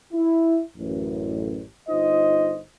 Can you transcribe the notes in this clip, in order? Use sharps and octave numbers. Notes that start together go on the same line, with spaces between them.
E4
A1 F#2
G1 D#4 F4 C5 D#5